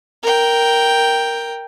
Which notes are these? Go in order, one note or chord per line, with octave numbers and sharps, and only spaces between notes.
A#4 G5